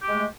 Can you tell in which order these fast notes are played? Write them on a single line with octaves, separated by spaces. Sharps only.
G4 G#3 A3